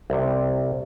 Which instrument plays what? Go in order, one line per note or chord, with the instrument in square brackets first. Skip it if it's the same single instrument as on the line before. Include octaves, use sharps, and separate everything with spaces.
[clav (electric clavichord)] C2 C3